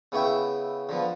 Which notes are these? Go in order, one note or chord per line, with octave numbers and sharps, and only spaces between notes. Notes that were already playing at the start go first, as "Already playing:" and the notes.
C#3 B3 E4 C#5 E5 G5
D3 F3 B3